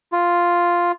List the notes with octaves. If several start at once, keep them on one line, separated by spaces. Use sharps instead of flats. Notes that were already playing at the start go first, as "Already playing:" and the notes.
F4